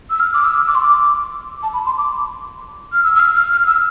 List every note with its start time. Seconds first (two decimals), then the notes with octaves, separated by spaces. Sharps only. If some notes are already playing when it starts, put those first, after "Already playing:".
0.10 E6
0.20 F6
0.34 D6
0.44 E6
0.67 D6
0.75 C6
0.82 D6
1.63 A5
1.73 B5
1.86 C6
1.98 D6
2.93 F6
3.04 E6
3.15 E6
3.20 F6
3.36 F6
3.52 F6
3.67 E6